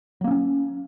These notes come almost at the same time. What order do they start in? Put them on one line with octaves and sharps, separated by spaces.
F#3 A#3 C4 C#4